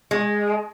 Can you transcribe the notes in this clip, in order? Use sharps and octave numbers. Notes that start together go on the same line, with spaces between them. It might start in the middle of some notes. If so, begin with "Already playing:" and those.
G#3